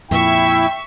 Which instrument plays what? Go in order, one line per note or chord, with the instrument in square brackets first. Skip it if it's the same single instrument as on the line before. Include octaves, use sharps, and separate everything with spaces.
[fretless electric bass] F2 A#2 [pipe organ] E4 [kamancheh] E5 C#6 [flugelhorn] G5